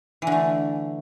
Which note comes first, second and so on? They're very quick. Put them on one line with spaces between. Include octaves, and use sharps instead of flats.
E3 D3 A3